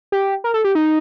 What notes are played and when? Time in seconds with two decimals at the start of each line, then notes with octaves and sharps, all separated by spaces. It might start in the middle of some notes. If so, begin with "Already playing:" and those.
0.12 G4
0.44 A#4
0.54 A4
0.64 G4
0.75 D#4